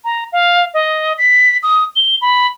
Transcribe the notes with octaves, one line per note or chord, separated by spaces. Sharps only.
A#5
F5
D#5
B6
D#6
G7
B5